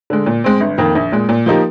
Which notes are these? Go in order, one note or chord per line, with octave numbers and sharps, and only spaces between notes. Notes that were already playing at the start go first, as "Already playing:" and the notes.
D3 G#3
A#2
G#3 C4
G1
F2 D#3 A#3
A#1
A#2 G#3
A#2
F3 A#3 D#4 G4